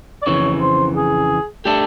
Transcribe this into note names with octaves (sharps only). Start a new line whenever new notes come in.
D5
F2 C#3 E3 C#5
C5
G#4
A3 D4 G4 A4